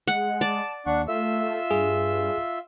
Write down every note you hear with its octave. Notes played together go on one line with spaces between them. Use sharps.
G#3 F#5
D5 A5
D#2 D4 F#5 C#6
A3 F4 E5 E6
G2 G#4